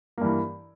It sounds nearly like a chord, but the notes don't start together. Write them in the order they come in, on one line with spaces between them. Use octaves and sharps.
A#3 G2 E3